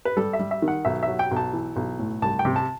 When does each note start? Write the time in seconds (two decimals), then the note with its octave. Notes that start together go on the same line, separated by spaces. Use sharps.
0.05 B4
0.17 G3 A4
0.33 E5
0.39 G3
0.51 E5
0.62 D#3
0.68 F#5
0.85 B1 E5
1.03 F#3 E5
1.19 G5
1.31 B1
1.36 A5
1.53 E3
1.76 B1
1.99 A2
2.22 C2 A5
2.39 G5
2.45 C3
2.56 A5